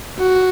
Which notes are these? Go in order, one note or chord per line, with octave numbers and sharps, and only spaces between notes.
F#4